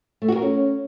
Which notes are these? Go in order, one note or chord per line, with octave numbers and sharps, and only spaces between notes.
A3
F#4
A#4
C#4